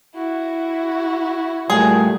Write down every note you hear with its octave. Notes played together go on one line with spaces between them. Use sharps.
E4 F#4
A#2 G3 A3 G#4